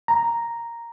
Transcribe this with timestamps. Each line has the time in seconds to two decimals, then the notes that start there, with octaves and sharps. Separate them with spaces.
0.08 A#5